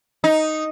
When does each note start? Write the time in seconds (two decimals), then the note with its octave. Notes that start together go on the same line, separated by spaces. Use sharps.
0.24 D#4